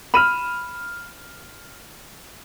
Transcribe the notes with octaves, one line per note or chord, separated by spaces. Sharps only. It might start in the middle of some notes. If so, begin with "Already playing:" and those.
B5 F6 D#7 E7